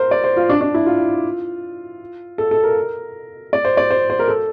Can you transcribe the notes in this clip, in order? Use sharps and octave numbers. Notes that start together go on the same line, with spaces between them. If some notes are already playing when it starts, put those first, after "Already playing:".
Already playing: A#4 C5
D5
C5
F4
D4
D4
E4
F4
A4
A4
A#4
D5
C5
D5
C5
C5
A#4
A4